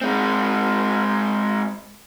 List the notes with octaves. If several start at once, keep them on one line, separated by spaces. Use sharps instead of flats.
G#3 C4